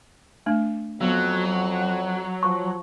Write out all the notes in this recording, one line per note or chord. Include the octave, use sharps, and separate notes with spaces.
A3 D4
F2 F#3 B3
F3 C#6